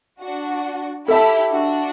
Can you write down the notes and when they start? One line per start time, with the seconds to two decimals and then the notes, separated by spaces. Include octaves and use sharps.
0.20 D4 F#4
1.08 E4 G4 A4 E5 A5
1.52 D4 F#4